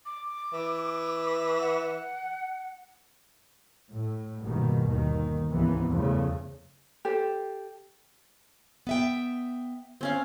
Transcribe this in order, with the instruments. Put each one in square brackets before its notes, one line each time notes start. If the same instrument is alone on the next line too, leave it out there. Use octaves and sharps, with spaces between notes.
[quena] D6
[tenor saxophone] E3
[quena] F#5
[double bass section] A2
F#1 G#2 B2 D#3 G3
G1 D#2 D#3
C#2 G#2 C3 E3 B3
E2 G2 C#3 F3 A3
[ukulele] G4 A4 C5
[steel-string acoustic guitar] B3 E5 G5
[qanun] C4 C#4 F5